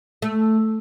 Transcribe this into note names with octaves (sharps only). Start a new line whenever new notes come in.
A3